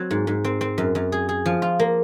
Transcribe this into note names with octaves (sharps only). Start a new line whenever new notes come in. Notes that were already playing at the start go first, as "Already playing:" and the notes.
Already playing: F#3 C4
G#2
G#2
C4
C4
F#2
F#2
G#4
G#4
F3
F4
A#3